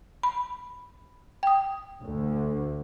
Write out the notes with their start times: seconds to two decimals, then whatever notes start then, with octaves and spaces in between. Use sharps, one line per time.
0.23 B5
1.43 G5 D#6
2.03 D2